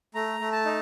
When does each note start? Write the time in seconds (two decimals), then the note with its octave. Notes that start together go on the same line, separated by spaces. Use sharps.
0.15 A3 A#5
0.40 A3
0.52 A5
0.65 D#4